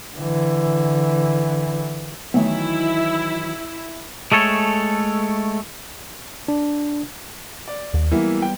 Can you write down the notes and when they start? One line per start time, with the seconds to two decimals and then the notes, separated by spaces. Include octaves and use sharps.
0.15 D3 E3
2.34 D#3 E3 F#3 A3 B3 E4
4.32 G#3 A3 A4 C#5
6.48 D4
7.68 D5
7.94 D#2
8.11 E3 F#3 G3 A#3 B3 E4
8.42 G5